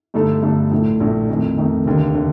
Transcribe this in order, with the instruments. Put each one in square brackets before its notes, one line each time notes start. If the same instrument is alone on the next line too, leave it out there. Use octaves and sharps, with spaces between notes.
[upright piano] G2 D3 A3 D#4 A4
G2 D3 A3 D#4 A4
A#1 A2 A3
A#1 A2 A3
F2 D#3 A3 D#4
F2 D#3 A3 D#4
F1 D#2 D3
D3